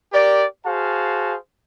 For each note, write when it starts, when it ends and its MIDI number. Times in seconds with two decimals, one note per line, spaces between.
0.13 0.45 67
0.13 0.45 70
0.13 0.45 74
0.65 1.36 66
0.65 1.36 68
0.65 1.36 72
0.65 1.36 77
0.65 1.36 81